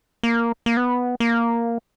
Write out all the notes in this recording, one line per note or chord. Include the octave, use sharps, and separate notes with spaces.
A#3
A#3
B3
A#3